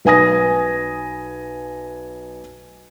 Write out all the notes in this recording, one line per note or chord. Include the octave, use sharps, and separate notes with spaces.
B1 B4 G#5 D#6 A#6